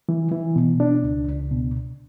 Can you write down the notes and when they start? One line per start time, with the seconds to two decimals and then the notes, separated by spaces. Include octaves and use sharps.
0.09 E3
0.32 E3
0.56 B2
0.80 D4
1.04 C#2
1.28 C#2
1.51 B2